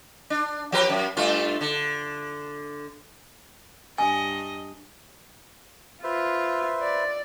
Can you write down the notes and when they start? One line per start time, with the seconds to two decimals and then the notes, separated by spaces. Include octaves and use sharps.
0.30 D4
0.72 F3 G4 B4
0.90 F#2
1.17 G2 A3 F4
1.61 D3
3.98 G2 D#5 G#5
6.04 F4 B4 C5 E5
6.82 D5